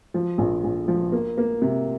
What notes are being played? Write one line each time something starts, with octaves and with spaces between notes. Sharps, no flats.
F3
A#1
A#1
F3
A#3
A#3
C3